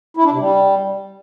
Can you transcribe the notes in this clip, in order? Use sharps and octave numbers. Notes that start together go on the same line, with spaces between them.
E4
D4
C3
G3